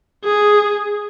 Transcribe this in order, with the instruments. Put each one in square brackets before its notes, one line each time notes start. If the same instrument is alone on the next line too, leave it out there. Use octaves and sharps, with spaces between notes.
[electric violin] G#4